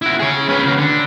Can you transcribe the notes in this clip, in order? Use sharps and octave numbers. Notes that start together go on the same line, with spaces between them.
E4 F#4
G#4 C#5
C#4 B4
C#3 F#4
D3